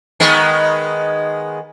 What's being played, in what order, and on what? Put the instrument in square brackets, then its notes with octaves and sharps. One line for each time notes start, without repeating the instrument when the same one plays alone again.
[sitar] D#3 G#3 B3